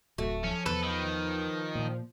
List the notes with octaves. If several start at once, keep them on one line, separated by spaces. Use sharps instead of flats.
D1 A3 F#4
F3 C#4
E2 A4 B4
D#3
A#2